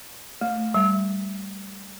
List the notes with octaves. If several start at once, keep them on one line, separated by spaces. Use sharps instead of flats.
A3
G3